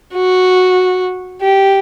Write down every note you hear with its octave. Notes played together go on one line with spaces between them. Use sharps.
F#4
G4